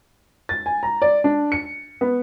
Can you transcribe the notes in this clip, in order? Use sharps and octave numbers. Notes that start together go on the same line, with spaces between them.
A6
G#5
A#5
D5
D4
C#7
B3